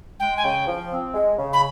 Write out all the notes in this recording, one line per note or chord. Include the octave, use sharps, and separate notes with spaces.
G#3 G5
G#5
C#3 G5
F3
C4
G#3
C#3
B5